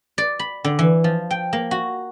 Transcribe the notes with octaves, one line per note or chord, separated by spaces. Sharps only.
D5
B5
D3
E3
F3
G5
A#3
F#4